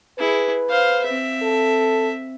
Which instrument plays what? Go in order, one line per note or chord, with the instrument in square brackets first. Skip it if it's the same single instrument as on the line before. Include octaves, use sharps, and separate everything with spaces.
[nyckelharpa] E4 G#4 [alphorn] B4
[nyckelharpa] C5 F5
C4 E5
[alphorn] A4